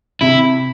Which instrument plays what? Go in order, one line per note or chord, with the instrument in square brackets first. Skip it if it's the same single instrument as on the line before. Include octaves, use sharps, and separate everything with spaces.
[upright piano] C3 [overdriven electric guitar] E4